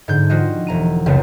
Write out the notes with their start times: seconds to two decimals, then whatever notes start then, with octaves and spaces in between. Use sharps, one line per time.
0.08 G#2 D3 G6
0.30 F3 G3 F4 F#4 D#5
0.67 E1 A#5 D#7
1.06 F1 C#2 C#3 F#3 G3 B3